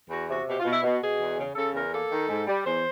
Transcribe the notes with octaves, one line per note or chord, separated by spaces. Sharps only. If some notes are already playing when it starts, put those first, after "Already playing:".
E2 F#4
C3 F#4
B2 G4
F4
B2
E4
B2
B2 G#4
E2
C#3
C#3 A4
E2 A#4
A#3 A4
D#3
G#2
G3
E2 C5